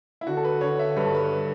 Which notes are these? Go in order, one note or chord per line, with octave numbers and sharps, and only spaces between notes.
E4
D3 F#4
A4
B4
D3 C#5
E5
G2 B4
A4
B4